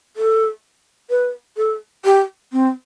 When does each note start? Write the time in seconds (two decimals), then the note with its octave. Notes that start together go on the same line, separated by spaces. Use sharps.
0.17 A4
1.10 B4
1.57 A4
2.05 G4
2.53 C4